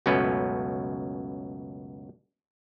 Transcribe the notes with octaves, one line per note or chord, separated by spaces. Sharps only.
C#2 F#2 B2 A3 C#4 B4